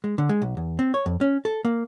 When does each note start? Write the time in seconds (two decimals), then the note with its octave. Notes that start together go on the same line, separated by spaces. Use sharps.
0.04 G#3
0.18 D3
0.29 G#3
0.42 B1
0.57 E2
0.79 C4
0.94 C#5
1.06 F2
1.21 C#4
1.45 A4
1.65 A#3